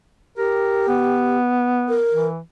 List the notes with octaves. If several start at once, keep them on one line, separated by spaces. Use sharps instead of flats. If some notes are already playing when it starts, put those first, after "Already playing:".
G4 A#4
B3
A#4
E3